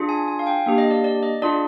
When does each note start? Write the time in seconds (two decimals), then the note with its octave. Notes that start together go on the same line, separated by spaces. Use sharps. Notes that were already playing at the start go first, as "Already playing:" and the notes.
Already playing: D4 F4 G#4
0.09 G#5
0.28 G#5
0.39 F5
0.47 G5
0.65 A#3 D4 G4 F5
0.78 D#5
0.91 D5
1.04 D5
1.23 D#5
1.42 D4 F4 G#4 D5